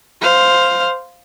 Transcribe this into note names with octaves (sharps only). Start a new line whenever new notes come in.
C5 F5